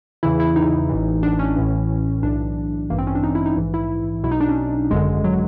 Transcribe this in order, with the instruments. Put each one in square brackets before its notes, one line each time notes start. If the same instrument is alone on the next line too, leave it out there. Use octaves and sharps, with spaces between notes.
[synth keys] E2 C#3 E3 E4
E4
D#4
A1 A2 E3
D4
C#4
A1 A2 E3
B1 A2 E3 D4
A1 G2 E3 A#3
C4
C#4
D4
D#4
E4
D#4
A#1 G#2 E3
E4
B1 B2 E4
D#4
D4
C#4
G#1 F#2 D3 G#3
F#3